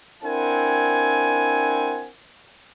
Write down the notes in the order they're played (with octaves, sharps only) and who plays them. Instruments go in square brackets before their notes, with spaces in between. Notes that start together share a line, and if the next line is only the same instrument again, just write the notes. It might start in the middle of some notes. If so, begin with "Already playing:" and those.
[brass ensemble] C4 D4 E4 A#4 F#5 G#5